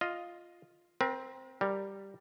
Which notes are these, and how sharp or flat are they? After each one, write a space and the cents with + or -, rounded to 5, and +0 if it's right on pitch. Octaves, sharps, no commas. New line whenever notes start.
F4 +0 D#5 +0
C4 +0 A#4 +45
G3 +0 A#4 +0